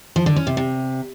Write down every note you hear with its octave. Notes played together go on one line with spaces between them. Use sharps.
F3
D3
C#4
C3
C3